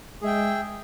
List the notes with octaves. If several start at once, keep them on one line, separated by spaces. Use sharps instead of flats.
G#3 G#4 E5 G5